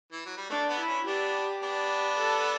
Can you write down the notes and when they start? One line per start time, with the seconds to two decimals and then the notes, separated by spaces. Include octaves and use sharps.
0.12 E3
0.26 F#3
0.37 G3
0.50 A3 D4
0.69 B3
0.79 E4
0.88 C#4
1.06 B3 D4 G4
1.63 B3 D4
2.19 A4